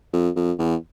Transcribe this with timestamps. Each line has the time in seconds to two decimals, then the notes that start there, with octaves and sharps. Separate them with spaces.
0.13 F2
0.36 F2
0.59 E2